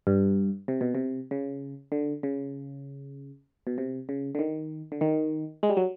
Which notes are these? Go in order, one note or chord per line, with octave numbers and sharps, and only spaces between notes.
G2
C3
B2
C3
C#3
D3
C#3
B2
C3
C#3
D3
D#3
D3
D#3
G#3
G3
F#3